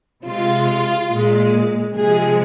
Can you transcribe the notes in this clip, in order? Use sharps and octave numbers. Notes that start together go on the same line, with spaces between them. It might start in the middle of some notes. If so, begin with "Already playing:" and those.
C3 G#3 F4
A#2 G#3
C3 F3 G#3 G#4